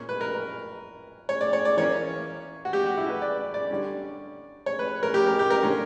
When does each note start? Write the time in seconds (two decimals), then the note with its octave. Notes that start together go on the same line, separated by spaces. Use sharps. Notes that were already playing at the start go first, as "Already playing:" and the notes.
Already playing: A#2 A#3 C#4
0.09 B4
0.21 A#4
1.29 C#5
1.41 D5
1.53 C#5
1.65 D5
1.77 E3 A#3 C#4 C#5
2.65 F#4
2.73 G4
2.86 F#4
2.97 E4
3.09 B4
3.22 D5
3.54 D5
3.70 D3 G3 C#4
4.66 C#5
4.79 B4
5.03 A#4
5.14 G4
5.27 A#4
5.39 G4
5.50 A#4
5.63 D3 A#3 C#4